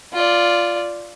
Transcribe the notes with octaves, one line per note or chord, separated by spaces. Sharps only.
F4 D5